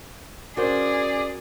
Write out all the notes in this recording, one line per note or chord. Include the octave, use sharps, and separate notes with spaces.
C#4 F#4 G#4 A#4 C5 D5